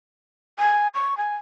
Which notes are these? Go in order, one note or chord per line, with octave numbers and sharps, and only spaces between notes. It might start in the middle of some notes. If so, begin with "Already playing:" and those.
G#5
C#6
G#5